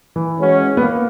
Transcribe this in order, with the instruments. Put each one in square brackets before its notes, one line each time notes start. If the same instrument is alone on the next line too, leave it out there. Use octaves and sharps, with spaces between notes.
[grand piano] E3
[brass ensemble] E3 G#3 C#4 F#4
[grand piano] B3
A#3